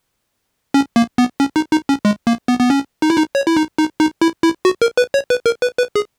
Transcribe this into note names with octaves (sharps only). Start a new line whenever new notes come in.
C#4
A#3
B3
C#4
D#4
D#4
C#4
G#3
A#3
B3
B3
C#4
D#4
E4
D#4
C#5
E4
D#4
D#4
D#4
E4
E4
F#4
A#4
B4
C#5
B4
A#4
B4
B4
G#4